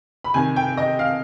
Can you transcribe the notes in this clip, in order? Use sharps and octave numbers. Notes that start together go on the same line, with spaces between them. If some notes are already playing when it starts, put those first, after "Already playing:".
B5
C3 D#3 G#5
G5
D#5
F5